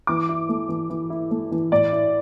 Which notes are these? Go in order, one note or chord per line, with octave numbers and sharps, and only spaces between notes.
E3 D6
E4
A3
E3
E3
E4
A3
E3
A2 D5
E4